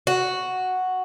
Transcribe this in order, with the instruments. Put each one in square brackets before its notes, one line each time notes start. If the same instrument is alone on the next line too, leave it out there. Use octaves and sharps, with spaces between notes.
[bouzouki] F#4